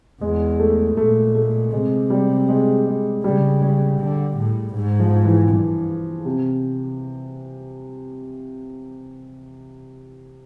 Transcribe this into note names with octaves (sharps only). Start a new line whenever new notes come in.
E2 G#3
A3
A#2 A3
A3
C3 G#3
G3
G#3
G#3
C#3 G3
G3
D3
A2
G#2
F3
E3
G2
C3